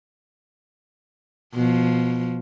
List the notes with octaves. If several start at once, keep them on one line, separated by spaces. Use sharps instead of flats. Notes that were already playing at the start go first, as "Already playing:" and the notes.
B2 F3